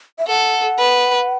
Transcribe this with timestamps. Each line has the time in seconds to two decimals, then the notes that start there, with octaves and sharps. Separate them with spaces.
0.19 E5
0.28 A4 F#5
0.78 B4